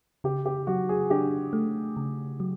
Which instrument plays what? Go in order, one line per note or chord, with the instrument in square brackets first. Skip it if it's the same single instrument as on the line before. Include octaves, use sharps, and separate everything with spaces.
[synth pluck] C#3 [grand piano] G4
[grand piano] G4
[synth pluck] F#3 [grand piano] F#4
[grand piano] G#4
[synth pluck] D4 [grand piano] G4
[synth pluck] A3
C#3
F#3